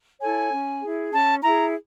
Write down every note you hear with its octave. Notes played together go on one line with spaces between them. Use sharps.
E4 A4 C#5 G#5
C#4
E4 G#4
C#4 A5
E4 G#4 A#5